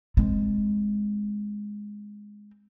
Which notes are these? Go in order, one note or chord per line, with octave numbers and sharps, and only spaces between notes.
G#3 C4